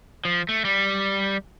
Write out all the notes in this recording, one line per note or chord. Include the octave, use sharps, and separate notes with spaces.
F3
A3
G3